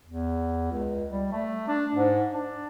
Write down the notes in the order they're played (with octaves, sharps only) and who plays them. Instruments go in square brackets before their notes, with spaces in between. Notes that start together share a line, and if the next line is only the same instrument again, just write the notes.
[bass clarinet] E2
C#2
G3
A3
D4
G#2
D4